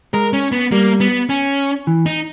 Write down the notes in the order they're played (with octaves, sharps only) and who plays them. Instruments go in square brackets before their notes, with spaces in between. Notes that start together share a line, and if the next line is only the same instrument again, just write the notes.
[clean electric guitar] G#3 [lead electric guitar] A#4
[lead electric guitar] C#4
B3
[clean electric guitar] G3 [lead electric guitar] A#3
[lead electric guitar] B3
C#4
[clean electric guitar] E3
[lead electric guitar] D#4